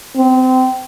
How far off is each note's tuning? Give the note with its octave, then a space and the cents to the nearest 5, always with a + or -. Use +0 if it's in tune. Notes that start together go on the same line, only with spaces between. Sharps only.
C4 -25